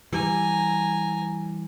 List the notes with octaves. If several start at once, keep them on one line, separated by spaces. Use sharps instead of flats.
E3 G3 G#5 A#5